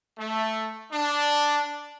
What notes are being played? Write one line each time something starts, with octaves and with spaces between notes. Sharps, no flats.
A3
D4